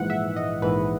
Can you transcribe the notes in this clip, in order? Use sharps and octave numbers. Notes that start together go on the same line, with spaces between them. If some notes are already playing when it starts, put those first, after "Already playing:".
Already playing: A#1 G#2 E3 F#5
E5
D#5
A#1 G#2 E3 B4